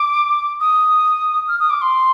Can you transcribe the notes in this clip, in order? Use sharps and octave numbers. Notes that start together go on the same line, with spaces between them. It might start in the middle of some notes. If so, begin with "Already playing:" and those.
Already playing: D6
D#6
F6
D#6
D6
C6